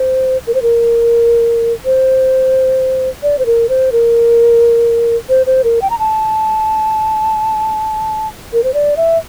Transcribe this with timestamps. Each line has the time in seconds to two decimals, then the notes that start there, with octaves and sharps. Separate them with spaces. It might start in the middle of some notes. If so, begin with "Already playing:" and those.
Already playing: C5
0.47 A#4
0.54 C5
0.62 A#4
1.85 C5
3.23 D5
3.39 C5
3.46 A#4
3.69 C5
3.92 A#4
5.29 C5
5.46 C5
5.64 A#4
5.82 G5
5.90 A#5
5.99 A5
8.53 A#4
8.64 C5
8.74 D5
8.97 E5